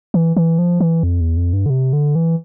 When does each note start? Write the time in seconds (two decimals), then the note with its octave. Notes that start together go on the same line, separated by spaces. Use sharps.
0.14 E3
0.37 E3
0.59 F3
0.80 E3
1.03 F2
1.21 E2
1.37 F2
1.53 G2
1.66 D3
1.70 C3
1.93 D3
2.15 E3